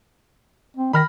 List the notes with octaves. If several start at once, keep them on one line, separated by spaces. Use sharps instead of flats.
C4
D#3 B5 F6 A#6